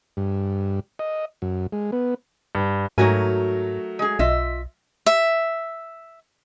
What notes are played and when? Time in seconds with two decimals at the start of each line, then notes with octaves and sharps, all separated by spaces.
0.17 G2
0.99 D#5
1.42 F#2
1.72 G#3
1.92 B3
2.55 G2
2.98 G#2 F#3 A3 D#4 F#4 A#4 G#5
3.99 G#3 G#4
4.19 B1 F4 D#5 E5
5.06 E5